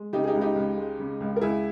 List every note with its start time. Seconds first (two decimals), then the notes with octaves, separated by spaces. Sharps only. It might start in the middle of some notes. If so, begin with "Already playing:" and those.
Already playing: G#3
0.13 C#3 D#4 G4
0.24 G#4
0.27 D#4 G4
0.34 C#2
0.41 D#4 G4
0.56 C#2
0.77 G#3
0.99 C#3
1.20 C#2
1.36 A#4
1.41 C#2 E4 G#4